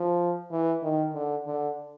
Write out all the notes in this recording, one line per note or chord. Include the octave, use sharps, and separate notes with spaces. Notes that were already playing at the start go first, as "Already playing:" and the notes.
Already playing: F3
E3
D#3
D3
D3